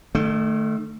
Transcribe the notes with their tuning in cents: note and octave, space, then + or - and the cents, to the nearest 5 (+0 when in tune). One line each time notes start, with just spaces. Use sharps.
D#3 -40 A3 +0